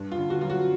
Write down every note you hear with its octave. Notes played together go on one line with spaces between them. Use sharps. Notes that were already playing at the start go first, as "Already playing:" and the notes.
Already playing: G2
F4
D3
F#4
F#3 F4
F#4